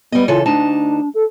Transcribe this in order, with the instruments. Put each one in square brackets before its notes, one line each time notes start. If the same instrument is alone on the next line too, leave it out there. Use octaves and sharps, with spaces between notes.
[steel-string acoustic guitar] G3 D#5 [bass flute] B3
[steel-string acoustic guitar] C#3 E3 A4 [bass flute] F4
[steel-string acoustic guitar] D2 D#4 A5 [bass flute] D4
[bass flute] A4